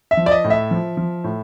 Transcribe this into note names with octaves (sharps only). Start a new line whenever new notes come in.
E5
F3
D5
D#5
A2
E5
F3
F3
A2